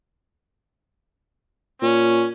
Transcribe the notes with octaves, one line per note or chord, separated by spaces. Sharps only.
A#2 C#4